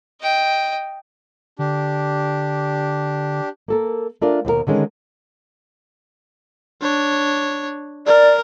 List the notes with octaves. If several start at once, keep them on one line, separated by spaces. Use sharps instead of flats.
D#5 G5
D3 D4 G4
A#3 A4 A#4
A3 D4 F4 A#4 D5
D#2 B2 F#4 A#4
D3 D#3 G#3 C#4
D4 C#5
A#4 D5